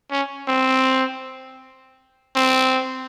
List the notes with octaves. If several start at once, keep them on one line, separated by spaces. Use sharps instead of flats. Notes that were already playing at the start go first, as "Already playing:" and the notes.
C#4
C4
C4